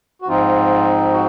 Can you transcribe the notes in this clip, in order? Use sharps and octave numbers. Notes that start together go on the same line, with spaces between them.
F#4
G#2 F3 C4 D#4 F4
F#4